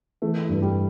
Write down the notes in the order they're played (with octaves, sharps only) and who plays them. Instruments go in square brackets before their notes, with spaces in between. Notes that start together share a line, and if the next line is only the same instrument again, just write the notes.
[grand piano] E3 [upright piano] A3
[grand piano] G2
[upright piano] G3